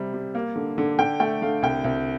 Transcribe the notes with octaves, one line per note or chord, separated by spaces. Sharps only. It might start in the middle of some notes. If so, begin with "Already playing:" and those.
Already playing: C3 G3
G3
A#3
D3
D3
D3 G5
A3 G5
D3 F5
C2 G5
C2